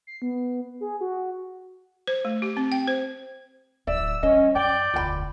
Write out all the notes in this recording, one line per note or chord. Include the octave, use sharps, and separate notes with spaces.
C7
B3
G#4
F#4
C5
A3
G4
C4
G5
C5
D1 D5 E5 E6
G3 C#4 D#5
F#2 D5 G5 G6
E1 D2 F4 G5 B5